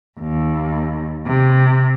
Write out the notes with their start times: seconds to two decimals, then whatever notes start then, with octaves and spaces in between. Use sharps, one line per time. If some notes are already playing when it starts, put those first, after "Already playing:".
0.20 D#2
1.26 C3